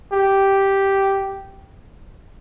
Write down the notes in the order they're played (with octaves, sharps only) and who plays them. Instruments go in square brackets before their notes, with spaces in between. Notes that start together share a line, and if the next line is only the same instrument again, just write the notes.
[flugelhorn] G4